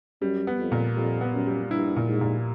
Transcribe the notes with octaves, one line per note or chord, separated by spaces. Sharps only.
F#2 G3
B3
F2
A#2
F2 G3
B3
F#2
G3
G2 E4
A#2
G#2
A#2